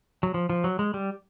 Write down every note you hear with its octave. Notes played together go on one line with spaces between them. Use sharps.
F#3
F3
F3
F#3
G#3
G3